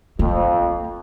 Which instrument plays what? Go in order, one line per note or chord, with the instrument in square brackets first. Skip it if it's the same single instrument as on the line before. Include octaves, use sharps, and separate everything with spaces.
[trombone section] F2 [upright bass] A#3